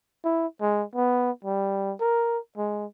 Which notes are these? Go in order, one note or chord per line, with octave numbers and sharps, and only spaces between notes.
E4
G#3
B3
G3
A#4
G#3